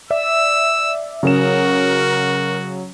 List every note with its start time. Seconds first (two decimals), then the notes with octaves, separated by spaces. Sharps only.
0.10 D5 E5 E6
1.23 C#3 F#3 F#4 A#4 C#5 E7